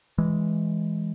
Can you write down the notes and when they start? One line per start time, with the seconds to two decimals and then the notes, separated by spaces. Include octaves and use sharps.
0.18 E3 G#3